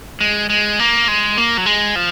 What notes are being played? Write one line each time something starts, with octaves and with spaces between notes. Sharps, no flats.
G#3
G#3
A#3
G#3
A#3
F#3
G#3
F3